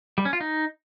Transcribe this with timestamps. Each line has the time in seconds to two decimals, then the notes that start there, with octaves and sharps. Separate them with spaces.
0.18 G3
0.25 C#4
0.33 F4
0.41 D#4